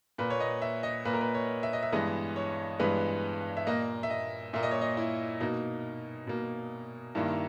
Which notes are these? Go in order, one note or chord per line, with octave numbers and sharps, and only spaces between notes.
A#2 A#3 B4
C#5
D#5
E5
D#5
A#2 A#3 B4
A#4
B4
C#5
E5
D#5
E5
G2 E3 G#3 B3 D#5
C#5
G2 E3 G#3 B3 B4
E5
A#2 A#3 D#5
E5
D#5
A#2 A#3 E5
D#5
C#5
D#5
E4
B2 A#3 D#4
B2 A#3
G2 D#3 A#3 E4